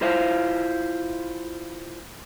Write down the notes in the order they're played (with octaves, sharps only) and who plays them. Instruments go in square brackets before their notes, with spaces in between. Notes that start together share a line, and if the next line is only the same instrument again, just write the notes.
[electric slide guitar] E4 F4 C5 E5 F5